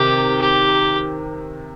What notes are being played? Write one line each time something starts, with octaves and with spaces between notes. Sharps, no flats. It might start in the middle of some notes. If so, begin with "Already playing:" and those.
Already playing: C3 D#3 G4
G4